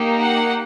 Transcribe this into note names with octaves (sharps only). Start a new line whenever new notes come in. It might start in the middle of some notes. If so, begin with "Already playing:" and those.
Already playing: A#3 D#4 G4
F#5